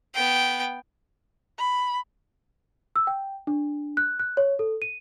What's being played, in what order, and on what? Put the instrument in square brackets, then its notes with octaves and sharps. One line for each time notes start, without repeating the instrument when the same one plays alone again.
[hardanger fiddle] B3 G5
[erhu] B5
[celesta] E6
G5
D4
F#6
F#6
C#5
A4
D#7